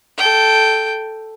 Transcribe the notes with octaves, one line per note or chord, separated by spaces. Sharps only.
A4 G5